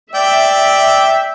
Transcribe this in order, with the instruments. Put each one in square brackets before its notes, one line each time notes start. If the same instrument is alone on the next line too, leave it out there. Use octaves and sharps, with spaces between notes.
[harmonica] D5 G5 [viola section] E5